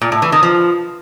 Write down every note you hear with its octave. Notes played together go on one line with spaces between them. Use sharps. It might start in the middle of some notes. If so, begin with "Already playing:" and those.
A#2
A2
E3
D#3
F3